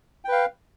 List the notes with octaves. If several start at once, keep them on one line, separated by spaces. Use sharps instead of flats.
B4 F5 G5